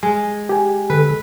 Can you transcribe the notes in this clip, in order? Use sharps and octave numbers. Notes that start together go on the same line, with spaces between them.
G#3
G4 G#5
D3 A4 B4